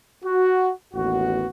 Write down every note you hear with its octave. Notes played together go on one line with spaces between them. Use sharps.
F#4
A1 D#2 B3 F#4